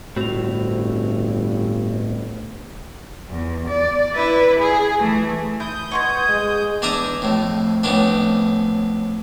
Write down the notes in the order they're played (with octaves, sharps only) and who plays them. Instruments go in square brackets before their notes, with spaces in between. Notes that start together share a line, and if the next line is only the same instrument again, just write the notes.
[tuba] G1 [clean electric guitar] A2 C4 [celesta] F#4 F7
[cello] E2
D5
E4 B4
G#4
E3 A3
[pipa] E4 [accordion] D#6 G6
[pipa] B2 C6 C#6 [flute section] F#5 G#6
[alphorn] G#3
[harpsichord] E2 D4 D5 E5 A#5 D#6
F2 A2
F2 A2 B3 C#4 D4